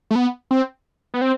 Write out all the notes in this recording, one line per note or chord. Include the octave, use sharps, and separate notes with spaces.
A3
B3
C4
B3
C4